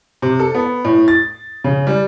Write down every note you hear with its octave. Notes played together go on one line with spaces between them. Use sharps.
C3
A4
B3
A2
A6
C#3
G3